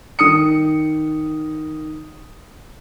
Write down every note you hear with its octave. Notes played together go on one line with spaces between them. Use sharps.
D#3 D#6 C#7